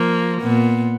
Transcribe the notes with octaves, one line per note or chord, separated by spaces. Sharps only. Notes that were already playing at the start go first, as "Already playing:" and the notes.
Already playing: F3 A#3
A#2 B3